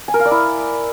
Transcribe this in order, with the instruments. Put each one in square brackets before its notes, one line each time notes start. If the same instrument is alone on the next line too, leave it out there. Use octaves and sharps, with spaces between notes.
[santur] G#5
A#4
F5
D5
E4